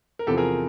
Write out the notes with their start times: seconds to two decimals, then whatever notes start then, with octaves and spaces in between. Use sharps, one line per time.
0.19 A#4
0.27 E2 C3 F3 G4 A4
0.37 G#4 A#4